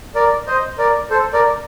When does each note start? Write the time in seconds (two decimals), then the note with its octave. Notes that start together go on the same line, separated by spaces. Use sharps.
0.15 A#4 D5
0.47 C5 D#5
0.78 A#4 D5
1.10 A4 C5
1.33 A#4 D5